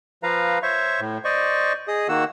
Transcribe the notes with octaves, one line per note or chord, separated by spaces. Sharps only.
F3 B4 F5 A#5
C5 C#5 E5 C#6
A2
C5 D5 D#5 C#6
G#4 D#5 D#6
D#3 A#3 F#4 F#5 E6